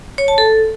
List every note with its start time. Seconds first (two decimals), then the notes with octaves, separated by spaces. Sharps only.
0.18 C#5
0.28 A5
0.38 A4